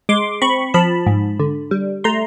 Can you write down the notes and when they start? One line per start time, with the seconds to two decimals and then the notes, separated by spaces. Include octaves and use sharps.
0.09 G#3 C6 D6
0.42 C4 B5 C#6
0.74 F3 A5 B5
1.06 G#2
1.40 D3
1.71 G3
2.04 A3 A#5 C6